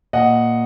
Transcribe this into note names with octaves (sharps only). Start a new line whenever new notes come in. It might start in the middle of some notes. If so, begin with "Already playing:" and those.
A#2 D#5 F#5